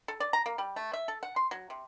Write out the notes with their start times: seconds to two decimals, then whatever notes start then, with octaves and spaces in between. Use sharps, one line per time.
0.08 A4
0.20 D5
0.33 A#5
0.46 A#3
0.58 G3
0.76 A3
0.93 E5
1.08 A4
1.23 F#5
1.36 C6
1.51 F#3
1.70 C3